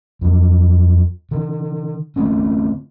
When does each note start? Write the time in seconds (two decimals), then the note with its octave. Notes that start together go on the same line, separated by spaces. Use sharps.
0.21 F2 F#3
1.31 D3 D#3
2.16 D3 A3 C4 C#4